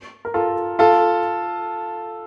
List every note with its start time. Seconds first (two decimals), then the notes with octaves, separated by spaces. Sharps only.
0.25 A#4
0.34 F4 A4
0.79 F4 A4